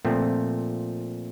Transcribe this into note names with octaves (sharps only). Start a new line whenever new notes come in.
A#2 F3 A3 C4